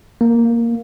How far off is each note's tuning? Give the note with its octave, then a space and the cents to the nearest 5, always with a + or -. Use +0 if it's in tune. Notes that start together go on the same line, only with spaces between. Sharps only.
A#3 +0